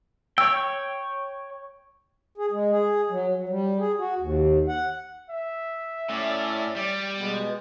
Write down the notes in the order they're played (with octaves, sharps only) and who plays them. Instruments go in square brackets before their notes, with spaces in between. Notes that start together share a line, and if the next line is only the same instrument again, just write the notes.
[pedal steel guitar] C#5 G5 [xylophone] E6
[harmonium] G#4
G#3
G#4
F#3
F#3
G3
G#4
F#4
D#2
F#5
[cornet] E5
[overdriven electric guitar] A2 [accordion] C#4 D5
[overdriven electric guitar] G3 [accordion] D5
[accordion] B2 G#3 B3